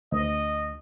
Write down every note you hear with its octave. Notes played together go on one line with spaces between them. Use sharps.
D2 D#5